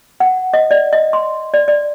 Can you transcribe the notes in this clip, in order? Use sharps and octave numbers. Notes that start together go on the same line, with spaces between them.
F#5
D#5
D5
D#5
C6
D5
D5